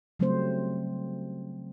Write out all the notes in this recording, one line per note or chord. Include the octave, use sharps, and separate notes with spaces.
C#3 F#3 G3 A3 C4 C5